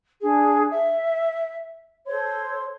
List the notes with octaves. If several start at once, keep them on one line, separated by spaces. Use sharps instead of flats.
D4 G#4
E5
A4 C5 C#5 C6